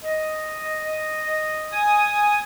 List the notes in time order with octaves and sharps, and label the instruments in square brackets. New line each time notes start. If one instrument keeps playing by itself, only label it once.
[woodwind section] D#5
[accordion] G#5 D#6